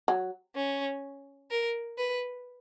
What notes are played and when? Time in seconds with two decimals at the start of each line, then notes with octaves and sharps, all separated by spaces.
0.08 F#3
0.55 C#4
1.51 A#4
1.98 B4